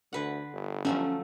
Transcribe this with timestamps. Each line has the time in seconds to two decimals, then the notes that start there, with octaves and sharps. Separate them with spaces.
0.13 D2 D3 B4 F#5
0.53 G1
0.85 F3 F#3 A3 C#4